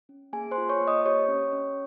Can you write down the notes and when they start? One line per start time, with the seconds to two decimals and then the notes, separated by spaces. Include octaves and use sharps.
0.09 C#4
0.33 A#3 G#4 G#5
0.51 C5 C6
0.58 F4
0.69 C#5 C#6
0.81 A#3
0.87 D#5 D#6
1.06 G4 C#5 C#6
1.29 C#4
1.53 C#4